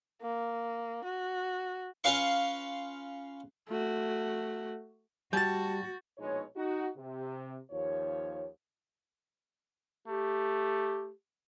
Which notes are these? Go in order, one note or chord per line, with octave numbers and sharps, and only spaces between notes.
A#3
F#4
C#4 F4 B4 F5 C6 C#6
A3 F#4
G3 F#4 A5 G6 A6
A#1 B2 G#3 D#4 C#5
D#4 F#4
C3
D#2 F3 C#5
A3 G4